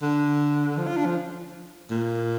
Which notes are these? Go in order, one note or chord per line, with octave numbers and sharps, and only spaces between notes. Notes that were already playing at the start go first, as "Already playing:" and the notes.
D3
F3
F4
D4
F3
A#2